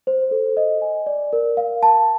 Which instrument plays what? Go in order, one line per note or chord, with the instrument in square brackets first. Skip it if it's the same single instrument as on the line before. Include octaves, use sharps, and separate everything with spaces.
[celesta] C5
A4
D#5
G#5
D5
A#4
F5
A5